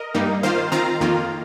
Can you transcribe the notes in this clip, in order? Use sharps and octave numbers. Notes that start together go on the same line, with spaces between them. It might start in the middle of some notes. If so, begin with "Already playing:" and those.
Already playing: A#4 D#5
G2 G3 A#3 D#4
D#3 A#3 F4 C5 F5
D#3 C4 F4 F5 A#5
F2 D#3 A#3 F4